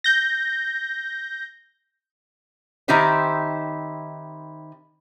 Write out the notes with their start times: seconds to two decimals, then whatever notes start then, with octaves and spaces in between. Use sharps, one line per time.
0.04 G6 A#6
2.88 D#3 C4 D#4 E4 G4 C5